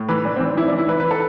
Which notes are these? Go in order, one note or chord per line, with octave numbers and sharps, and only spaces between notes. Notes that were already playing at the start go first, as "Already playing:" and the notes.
Already playing: A2
E3 B4
E3 D4
E3 C4
D4
E3 E4
E3 D4
E4
E3 B4
B4
A4